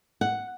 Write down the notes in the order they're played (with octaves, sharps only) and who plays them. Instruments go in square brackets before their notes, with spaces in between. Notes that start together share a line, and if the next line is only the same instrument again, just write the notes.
[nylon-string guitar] F#5